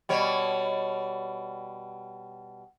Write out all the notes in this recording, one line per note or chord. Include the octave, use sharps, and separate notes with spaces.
B2 G3 C#5